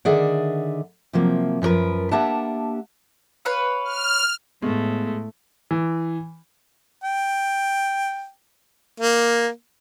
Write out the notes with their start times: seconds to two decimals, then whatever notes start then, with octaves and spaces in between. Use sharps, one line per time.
0.05 D3 D#3 G#4 D5 E5 F#5
1.13 C3 F3 F#3 A#3
1.62 F#2 F3 D#4 A#4 B4
2.11 A#3 D4 G4 E5 F#5 A5
3.45 B4 C#5 F5
3.85 F6
4.62 A2 G#3 A3 B3
5.71 E3
7.03 G5
9.00 A#3